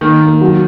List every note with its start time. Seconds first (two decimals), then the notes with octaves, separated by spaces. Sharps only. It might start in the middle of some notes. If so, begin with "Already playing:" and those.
0.01 D#3 A#3
0.21 A#3
0.41 F#3